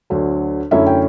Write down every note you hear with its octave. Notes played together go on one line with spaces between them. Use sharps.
D2 D3 F#3
F#2 D3 A3 C#4 E4 E5
G5